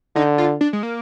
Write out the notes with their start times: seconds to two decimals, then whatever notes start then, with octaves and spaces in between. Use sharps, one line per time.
0.15 D3 D#4
0.38 F4
0.61 D4
0.73 G#3
0.83 A#3